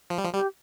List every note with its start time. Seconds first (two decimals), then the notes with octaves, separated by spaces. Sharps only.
0.10 F3
0.18 G3
0.24 F3
0.33 G3 G4